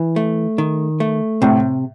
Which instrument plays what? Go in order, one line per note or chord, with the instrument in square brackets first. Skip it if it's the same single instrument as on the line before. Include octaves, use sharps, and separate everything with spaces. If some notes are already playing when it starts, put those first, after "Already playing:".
Already playing: [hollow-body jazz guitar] E3
A3
D#3
A3
[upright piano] A2 [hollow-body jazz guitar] C3